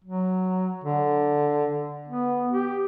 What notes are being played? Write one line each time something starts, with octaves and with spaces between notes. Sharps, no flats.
F#3
D3
B3
G4